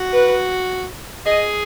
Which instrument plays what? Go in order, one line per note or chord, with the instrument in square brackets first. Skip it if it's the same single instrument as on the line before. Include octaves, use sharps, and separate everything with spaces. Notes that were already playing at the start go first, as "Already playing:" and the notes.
Already playing: [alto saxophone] F#4
[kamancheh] B4
[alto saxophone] G#4 [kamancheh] D#5